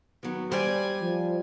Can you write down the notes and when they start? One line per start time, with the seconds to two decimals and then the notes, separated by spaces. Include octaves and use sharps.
0.23 D#3 F#3 B3
0.52 G3 C5 D5 G#5
1.01 F3